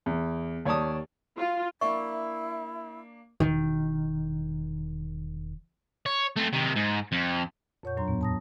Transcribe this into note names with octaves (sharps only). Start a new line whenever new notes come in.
E2
D#2 C#5 D5 A5 D#6
F4
A#3 D4 E4 E5 C#6
E1 D#3
C#5
A3 C4
C3 D#3
G#2
F2
F2 A#2 C#5 F#5 C#6 G6
D#2 A2 F#3 D4 A#5 C6
A2 B3
A5 D#6 A#6